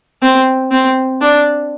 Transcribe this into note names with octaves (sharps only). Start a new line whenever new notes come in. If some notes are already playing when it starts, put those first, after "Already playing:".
C4
C4
D4